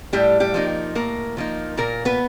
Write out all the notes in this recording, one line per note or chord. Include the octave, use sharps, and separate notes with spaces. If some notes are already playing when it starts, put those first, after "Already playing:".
A2 G3 G4
G3 G4
F3 A#3 D#4
A2 A#3 A#4
F3 A#3 D#4
A#2 A#3 A#4
B3 B4